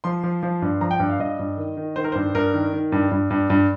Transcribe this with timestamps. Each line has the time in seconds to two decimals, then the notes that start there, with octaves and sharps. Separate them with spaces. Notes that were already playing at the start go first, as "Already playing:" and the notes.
0.04 F3 C6
0.24 F3
0.43 F3
0.62 G2
0.81 F3 A#5
0.91 G5
1.00 G2
1.10 F5
1.20 G2 D#5
1.39 G2
1.57 D#3
1.77 D#3
1.96 D#3 C5
2.04 A#4
2.12 G2 C5
2.34 G2 A#4
2.54 D#3
2.73 D#3
2.92 G2
3.11 G2
3.30 G2
3.50 G2